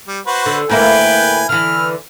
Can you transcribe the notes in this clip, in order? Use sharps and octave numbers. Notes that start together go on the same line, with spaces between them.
G3
F#4 B4 C5
D3
D2 A#3 E4 B4 G5 G#5
D3 E3 F6